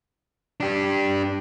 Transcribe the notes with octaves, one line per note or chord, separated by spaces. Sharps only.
D4 G4